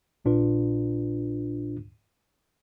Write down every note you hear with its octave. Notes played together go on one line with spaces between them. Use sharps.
A#1 A#2 D4 F4 B4